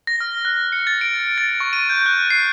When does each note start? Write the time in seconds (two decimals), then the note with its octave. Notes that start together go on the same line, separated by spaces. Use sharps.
0.07 A#6
0.20 F6
0.45 F#6
0.72 C#7
0.87 A6
1.01 D7
1.38 A6
1.60 C#6
1.73 D#7
1.89 G6
2.06 F#6
2.30 C7